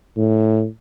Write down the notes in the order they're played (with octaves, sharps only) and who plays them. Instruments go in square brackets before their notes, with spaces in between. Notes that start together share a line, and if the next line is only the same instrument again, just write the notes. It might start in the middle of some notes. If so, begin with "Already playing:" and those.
[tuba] A2